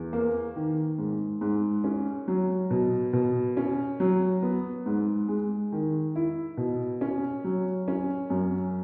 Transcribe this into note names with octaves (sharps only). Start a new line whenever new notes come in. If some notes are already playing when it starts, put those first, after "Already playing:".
Already playing: E2
A#3
D#3
G#2
G#2
C#4
F#3
B2
B2
C#4
F#3
B3
G#2
G#3
D#3
E4
B2
C#4
F#3
C#4
F#2